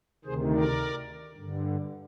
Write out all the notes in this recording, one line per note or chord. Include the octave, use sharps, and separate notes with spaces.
D2 C3 D#3 G#4 C5
A#4 D5
G2 D3